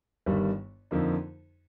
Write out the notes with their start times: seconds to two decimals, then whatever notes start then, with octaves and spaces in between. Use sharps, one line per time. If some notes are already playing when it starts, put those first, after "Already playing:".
0.26 G1 G2 D#3 G3
0.91 F2 D3 F3 A#3 D#4